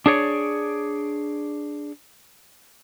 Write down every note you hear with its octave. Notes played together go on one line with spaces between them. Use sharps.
D4 G#4 C#5 D5